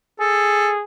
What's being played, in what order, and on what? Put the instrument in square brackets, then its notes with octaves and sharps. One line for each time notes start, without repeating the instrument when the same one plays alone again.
[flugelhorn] G#4 [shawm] A4